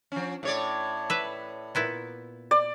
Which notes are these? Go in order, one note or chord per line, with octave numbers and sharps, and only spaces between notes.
F3 C#4
A2 C#5 D5
B4 E5
A#2 B3 E4
D5